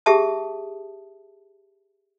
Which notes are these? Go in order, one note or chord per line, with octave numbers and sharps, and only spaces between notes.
G4 G#4 E5 A5 D#6